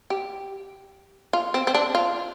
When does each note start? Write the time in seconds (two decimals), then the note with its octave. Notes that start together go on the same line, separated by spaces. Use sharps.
0.10 G4
1.33 F4
1.54 C4
1.67 C4
1.74 D4
1.95 F4